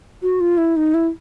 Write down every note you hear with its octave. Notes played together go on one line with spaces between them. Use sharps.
F#4
F4
E4
D#4
E4